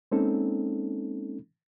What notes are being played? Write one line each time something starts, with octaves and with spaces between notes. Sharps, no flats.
G#3 A#3 C4 C#4 D#4 A4